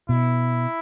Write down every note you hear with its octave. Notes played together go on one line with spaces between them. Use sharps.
B2 E4